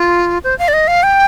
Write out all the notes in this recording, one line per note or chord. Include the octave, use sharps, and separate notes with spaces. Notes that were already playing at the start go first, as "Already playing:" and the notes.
Already playing: F4
C5
F5
D5
D#5
F5
G5